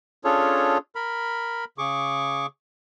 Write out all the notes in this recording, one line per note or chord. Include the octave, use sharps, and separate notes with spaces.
C#4 D4 F4 G#4 A4 C#5
A#4 B5
C#3 G#4 C#6 D6